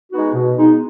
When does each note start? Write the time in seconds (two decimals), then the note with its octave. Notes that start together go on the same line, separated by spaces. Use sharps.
0.13 G#3 B3 D#4 F#4
0.34 B2
0.57 G#3 B3 D#4